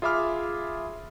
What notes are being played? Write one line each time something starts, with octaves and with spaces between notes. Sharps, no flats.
F4 G#4 E5 B5 D6 F6